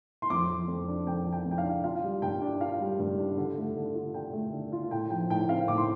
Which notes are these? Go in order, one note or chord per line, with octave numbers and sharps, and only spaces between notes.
C6
F2 D6
F3
F2
D4
F2 G5
F3
G5
F2
G5
F5
D4
F4 F5
G3
G2 G5
D4
F4 F5
G3
G2
D4
D3
A3
D3
F4
D3 G5
A3
D3
F4
A2 G5
F3 G5
A2 G5
C4 F5
A2 D6
C6